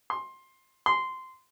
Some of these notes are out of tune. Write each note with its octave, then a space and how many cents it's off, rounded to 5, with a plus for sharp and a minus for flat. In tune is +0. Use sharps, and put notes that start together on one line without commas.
C6 +15
C6 -15